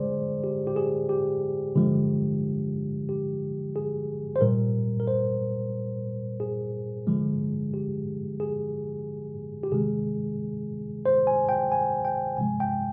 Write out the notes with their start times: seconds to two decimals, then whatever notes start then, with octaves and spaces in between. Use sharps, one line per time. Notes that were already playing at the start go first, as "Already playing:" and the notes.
Already playing: D3 G#3 G#4 C5 D5
0.44 G4
0.67 G4
0.76 G#4
1.09 G4
1.76 D3 F3 G#3
3.09 G4
3.76 G#4
4.36 C5
4.41 A#2 G3 A#4
5.00 A#4
5.07 C5
6.40 G#4
7.07 D3 F3 G#3
7.74 G4
8.40 G#4
9.63 G4
9.72 C3 D#3 G#3 G#4
11.06 C5
11.27 G#5
11.49 G5
11.72 G#5
12.05 G5
12.37 C3 F3 G#3 G#5
12.60 G5